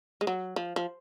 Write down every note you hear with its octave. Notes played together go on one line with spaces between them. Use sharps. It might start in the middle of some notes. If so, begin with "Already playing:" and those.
G#3
F#3
F3
F3